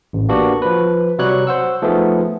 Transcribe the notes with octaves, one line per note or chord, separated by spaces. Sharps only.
A1
A#3 B3 D4 F#4 G4
F3 B4
C3 F#3 G3 C#5 F#6
C5 F#5 E6
F3 A3 B3 D#4 G#4